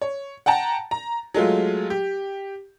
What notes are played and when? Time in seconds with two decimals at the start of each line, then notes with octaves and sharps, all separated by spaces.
0.02 C#5
0.46 F#5 G5 A5 A#5
0.91 A#5
1.34 F#3 G#3 A3 F4
1.90 G4